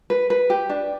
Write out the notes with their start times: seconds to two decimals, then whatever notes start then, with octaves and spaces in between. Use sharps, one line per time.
0.10 B4
0.30 B4
0.50 G4
0.69 D4